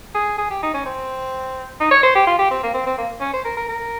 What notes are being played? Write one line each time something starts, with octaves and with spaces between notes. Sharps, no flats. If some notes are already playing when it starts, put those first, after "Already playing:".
G#4
G#4
G4
D#4
C#4
C4
D#4
C#5
C5
G4
F4
G4
C4
A#3
C4
C4
A#3
C#4
C5
A#4
A#4
A#4